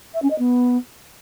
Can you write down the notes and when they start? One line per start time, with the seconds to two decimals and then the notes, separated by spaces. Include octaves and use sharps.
0.14 E5
0.22 C#4
0.30 D#5
0.38 B3